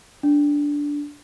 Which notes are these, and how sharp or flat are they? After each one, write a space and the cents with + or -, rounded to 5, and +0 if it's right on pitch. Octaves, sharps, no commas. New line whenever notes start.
D4 -10